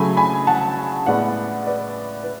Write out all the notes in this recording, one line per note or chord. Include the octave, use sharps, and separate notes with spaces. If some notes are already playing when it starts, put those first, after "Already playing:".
Already playing: C#3 F#3 A3 G#5 B5
G#5 B5
F#5 A5
A2 G#3 B3 D5 F#5
B4 D5
B4